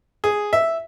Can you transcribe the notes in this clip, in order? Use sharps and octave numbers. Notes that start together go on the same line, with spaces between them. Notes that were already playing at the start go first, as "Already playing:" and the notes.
G#4
E5